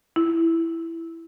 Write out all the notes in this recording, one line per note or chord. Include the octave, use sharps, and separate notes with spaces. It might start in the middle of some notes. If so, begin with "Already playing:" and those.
E4